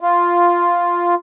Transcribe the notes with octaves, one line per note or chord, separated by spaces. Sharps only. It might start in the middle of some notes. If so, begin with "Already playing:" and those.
F4